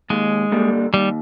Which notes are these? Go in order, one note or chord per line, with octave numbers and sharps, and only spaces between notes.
D#2 G#3
D3 G3 A#3
D#2 G3